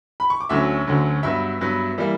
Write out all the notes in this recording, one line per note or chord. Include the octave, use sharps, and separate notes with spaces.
B5
C#6
D6
D2 D3 F#3 C#4 E5 E6
D2 D3 F#3 C#4
G2 F#3 B3 E5 E6
G2 F#3 B3
E3 G3 A#3 E4